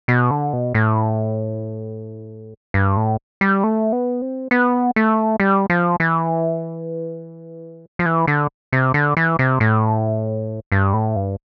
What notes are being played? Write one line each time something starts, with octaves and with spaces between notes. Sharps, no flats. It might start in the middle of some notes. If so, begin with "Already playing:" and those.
B2
D3
B2
A2
G2
A2
G3
A3
B3
C4
B3
A3
G3
F3
E3
F3
E3
D3
C3
D3
E3
C3
A2
G2
A2
G2